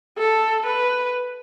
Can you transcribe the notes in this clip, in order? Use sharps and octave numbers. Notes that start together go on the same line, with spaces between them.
A4
B4